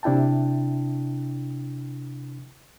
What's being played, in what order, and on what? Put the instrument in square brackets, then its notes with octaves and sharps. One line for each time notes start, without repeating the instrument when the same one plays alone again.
[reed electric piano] C3 D4 E4 G5 A5